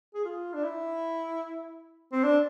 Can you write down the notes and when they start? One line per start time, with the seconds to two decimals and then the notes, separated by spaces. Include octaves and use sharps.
0.15 G#4
0.25 F4
0.54 D4
0.64 E4
2.12 C4
2.24 D4